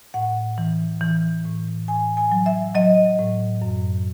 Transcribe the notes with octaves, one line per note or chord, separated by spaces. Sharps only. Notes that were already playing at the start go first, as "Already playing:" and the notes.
A2 F#5
E3
E3
A2
A2 G#5
G#5
F#3
E5
F#3 D#5
A2
F#2